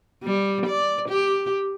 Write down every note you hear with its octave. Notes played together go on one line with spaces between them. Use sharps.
G3
D5
G4